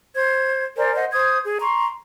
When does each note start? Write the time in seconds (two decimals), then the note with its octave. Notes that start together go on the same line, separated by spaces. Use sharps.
0.16 C5 G#6
0.76 A#4 C5 D5 G#5
0.95 C5 D#5 F#5
1.12 C5 D#6 G#6
1.44 G#4
1.60 A#5 C6 C#6